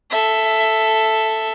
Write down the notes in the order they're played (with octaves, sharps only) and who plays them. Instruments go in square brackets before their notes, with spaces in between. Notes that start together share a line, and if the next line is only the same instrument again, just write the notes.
[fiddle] A4 E5